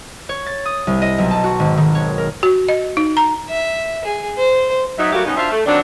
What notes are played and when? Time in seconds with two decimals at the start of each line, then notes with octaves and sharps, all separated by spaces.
0.29 C#5
0.46 A6
0.65 D#6
0.87 C2
1.02 D#5
1.18 B1
1.31 A5
1.44 F#4
1.59 G#1
1.77 D#3
1.95 C#5
2.18 A#4
2.43 F#4
2.68 D#5
2.97 D#4
3.17 A#5
3.49 E5
4.04 G#4
4.38 C5
4.98 F#3 D#4 E5
5.12 F#3 G3 A3 A#3 F#4 G4
5.25 B2 G3 B3 C#4 D#4
5.37 D4 F4 C5 E5
5.51 A3
5.66 D#3 F#3 C4 D4